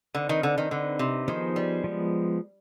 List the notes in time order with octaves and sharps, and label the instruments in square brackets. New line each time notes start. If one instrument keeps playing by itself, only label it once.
[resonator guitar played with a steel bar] D3 [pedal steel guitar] C4 D#4 B4
[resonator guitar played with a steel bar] D#3
D3
D#3
[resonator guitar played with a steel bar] D3 [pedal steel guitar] C4 D#4 B4
[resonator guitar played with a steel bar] C3
[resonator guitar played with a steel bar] D#3 [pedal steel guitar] F3 B3 D#4 G#4 C5
[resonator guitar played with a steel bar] G3
[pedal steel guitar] F3 G#3 B3